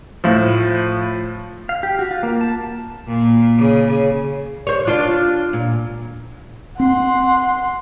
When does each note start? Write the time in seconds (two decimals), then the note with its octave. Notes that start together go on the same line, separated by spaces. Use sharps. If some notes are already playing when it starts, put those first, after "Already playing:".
0.24 A2 F3
1.69 F5
1.83 G4
1.99 F#4
2.11 F4
2.23 A#3
2.41 A5
3.08 A#2
3.58 C#3
4.67 C5 C#5
4.87 D4 F4
5.53 A#2
6.80 C4 F#5 C6